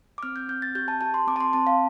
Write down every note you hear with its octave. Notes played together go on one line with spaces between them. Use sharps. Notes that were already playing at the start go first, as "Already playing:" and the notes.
D6
C4 F6
G6
C4 G6
A6
G4 G6
A5
G4 A5
C6
C4 D6
A5
C6
C4 A5
F5